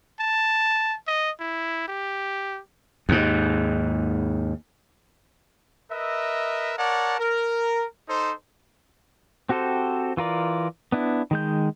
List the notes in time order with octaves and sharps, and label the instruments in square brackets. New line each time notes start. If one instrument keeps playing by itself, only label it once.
[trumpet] A5
D#5
E4
G4
[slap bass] D#2 G#2
[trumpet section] A#4 B4 D#5 E5
A#4 C#5 D5 F#5 A5
A#4
D#4 A4 C5
[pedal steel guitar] C4 F#4 G4 A4 C5
E3 F4 A#4 D5
B3 D4 E4
D#3 G#3 G6